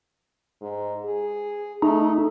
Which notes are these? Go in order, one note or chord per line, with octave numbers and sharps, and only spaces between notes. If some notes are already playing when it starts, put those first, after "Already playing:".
G#2
G#4
A3 D#4